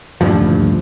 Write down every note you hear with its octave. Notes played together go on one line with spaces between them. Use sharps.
D#1 D2 G2 F3